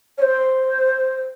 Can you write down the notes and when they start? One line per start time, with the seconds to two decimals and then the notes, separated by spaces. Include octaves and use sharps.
0.18 C#5
0.22 C5